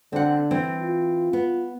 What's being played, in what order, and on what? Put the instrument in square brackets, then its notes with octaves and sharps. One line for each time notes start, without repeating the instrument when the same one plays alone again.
[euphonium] D3 [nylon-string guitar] C4 F#5
[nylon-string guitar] E3 C4
[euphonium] F4
[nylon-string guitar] B3